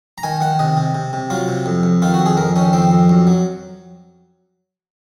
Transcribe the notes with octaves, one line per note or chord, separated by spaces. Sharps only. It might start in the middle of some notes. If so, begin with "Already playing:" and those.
A#5
D#3 G#5
D#3 F#5
C3 D#5
C3
C3
C3
F#3 F4
C3
F2
F2
D#3 F4
F#4
F2
G#4
F2 A#4
D#3 C#4
F2 C4
F2
F#2
F#3